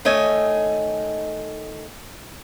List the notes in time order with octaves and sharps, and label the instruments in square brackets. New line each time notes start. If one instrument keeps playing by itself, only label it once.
[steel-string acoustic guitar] D#3 A3 C#5 D#5 G#5